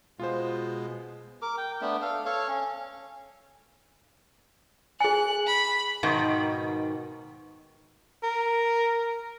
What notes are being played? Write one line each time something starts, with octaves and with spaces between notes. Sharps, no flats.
B2 G#3 F4 C5
A#4 D6
G5
A3 B3 D4
A4 F5
A4 C#5 F5
C#4
G#4 G#5 F#6
B5
G#2 B2 D#3
A#4